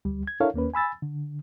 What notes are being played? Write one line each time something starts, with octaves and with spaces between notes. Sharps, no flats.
D2 G3
G#6
D4 E4 A4 A#4 C#5 F5
D#2 A#3 C#4 B4
G#5 B5 E6 A6
D3